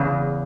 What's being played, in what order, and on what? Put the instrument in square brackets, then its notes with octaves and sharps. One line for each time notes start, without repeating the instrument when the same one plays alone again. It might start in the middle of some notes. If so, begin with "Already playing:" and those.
Already playing: [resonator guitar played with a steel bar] E2 C#3